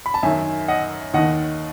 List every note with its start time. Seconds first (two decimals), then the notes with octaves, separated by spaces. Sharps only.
0.06 B5
0.14 A5
0.23 F#2 D#3 E5 G#5
0.68 D#5 F#5
1.14 D#2 D#3 D#5 F#5